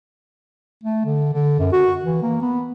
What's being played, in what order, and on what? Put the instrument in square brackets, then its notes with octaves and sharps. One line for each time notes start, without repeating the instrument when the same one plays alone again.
[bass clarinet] A3
D3
D3
F#2
F#4
E3
A#3
B3